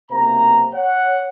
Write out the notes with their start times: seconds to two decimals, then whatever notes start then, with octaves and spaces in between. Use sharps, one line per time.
0.11 B1 C3 A#3 C5 A#5
0.73 C#5 F#5